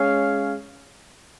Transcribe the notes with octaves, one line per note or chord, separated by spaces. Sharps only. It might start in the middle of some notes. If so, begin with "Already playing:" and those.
Already playing: G#3 C#4 G#4 C#5 F5